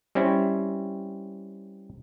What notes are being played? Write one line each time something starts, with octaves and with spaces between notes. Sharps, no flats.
G3 C4 C#4 E4